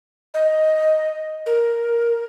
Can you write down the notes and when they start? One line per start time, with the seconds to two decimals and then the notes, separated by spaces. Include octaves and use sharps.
0.34 D#5
1.46 A#4